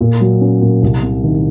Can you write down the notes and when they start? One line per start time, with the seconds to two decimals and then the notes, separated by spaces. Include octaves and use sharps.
0.01 A#2
0.21 F#3
0.41 C#4
0.62 A#2
0.82 C2
1.02 C3
1.24 D#3